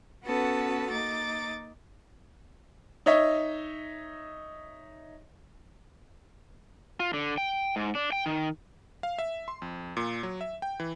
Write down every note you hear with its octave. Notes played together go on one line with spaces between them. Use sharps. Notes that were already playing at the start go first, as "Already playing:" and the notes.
B3 C#4 F#4 A4 B4 A5
A#3 D#4 D6 A6
D#4 C#5 D#5 E5
F4
D3
G5
G#2
D4
G5
D#3
F5
E5
C6
F2
A#2
F#3
E5
G5
E3